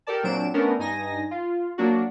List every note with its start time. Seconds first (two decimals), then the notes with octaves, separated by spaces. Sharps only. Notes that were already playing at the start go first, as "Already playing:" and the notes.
0.07 G4 A4 A#4 D5 A5
0.23 A#2 F#3 C4 D4 D7 E7
0.54 A3 B3 C#4 D4 A#4
0.79 G2 D#4 G#5 A#6
1.31 F4
1.78 F#3 A#3 D4 F#4